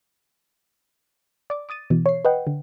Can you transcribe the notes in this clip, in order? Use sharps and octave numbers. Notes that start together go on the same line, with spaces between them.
D5 D6
D6 D#6 A6 D#7
B2 E3
C#5 C7
B4 D#5 F#5 G5
D3